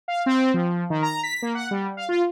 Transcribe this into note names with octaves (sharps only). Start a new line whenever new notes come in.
F5
C4
F3
D#3
A#5
B6
A#3
F#5
G3
F5
F4